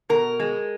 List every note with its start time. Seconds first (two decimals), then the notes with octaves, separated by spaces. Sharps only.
0.09 B2 A#4
0.40 G#3